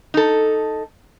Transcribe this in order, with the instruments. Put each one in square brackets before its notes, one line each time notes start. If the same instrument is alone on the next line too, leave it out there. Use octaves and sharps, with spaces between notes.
[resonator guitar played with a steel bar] D#4 A4